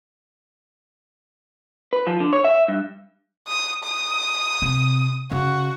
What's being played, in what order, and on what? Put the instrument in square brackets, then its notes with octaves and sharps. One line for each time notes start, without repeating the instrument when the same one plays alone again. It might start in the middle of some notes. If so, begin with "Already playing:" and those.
[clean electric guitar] B4
F3
D3
C#5
E5
G2
[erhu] D#6
D#6
[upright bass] C3
[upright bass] C#3 [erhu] F#4